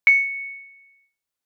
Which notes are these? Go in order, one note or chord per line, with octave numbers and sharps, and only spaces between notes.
C#7